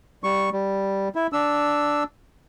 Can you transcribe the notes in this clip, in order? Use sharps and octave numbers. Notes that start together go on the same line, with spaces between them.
G3 C#6
G3
E4
D4 E6